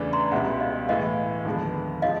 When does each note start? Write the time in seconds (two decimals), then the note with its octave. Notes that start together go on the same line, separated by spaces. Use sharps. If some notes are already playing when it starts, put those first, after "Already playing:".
Already playing: E2 C#3 E3 A3 D4
0.13 A#5 C6
0.31 C#2 B2 G3 E5 F#5
0.60 D#5 F5
0.88 A2 E3 G#3 D#5 F5
1.45 D#2 D3 F3 G#3 B3
2.02 F3 G#3 C4 D#4 D#5 F5